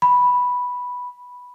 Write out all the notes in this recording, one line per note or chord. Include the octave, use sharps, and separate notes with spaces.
B5